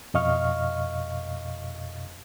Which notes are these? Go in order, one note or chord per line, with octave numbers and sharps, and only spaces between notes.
F2 B2 D#5 F5 C#6 F6